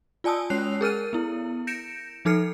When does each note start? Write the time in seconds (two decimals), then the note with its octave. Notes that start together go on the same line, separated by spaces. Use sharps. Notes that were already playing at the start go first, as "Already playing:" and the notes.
0.24 F4 D5 G#5 A5 D#6 E6
0.50 G#3 C#4 C#5 F#6 C7 F7
0.81 G#4 A#4 F6 D#7
1.13 B3 E4
1.67 G6 A#6 C#7 D7 E7
2.25 F3 D#4 A4 F6 C7 C#7